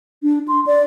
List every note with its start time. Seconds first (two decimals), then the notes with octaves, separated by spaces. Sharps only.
0.23 D4
0.48 C6
0.67 D5